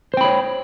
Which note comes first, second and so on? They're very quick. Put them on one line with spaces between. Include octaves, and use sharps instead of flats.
C5 G5 B5 C#5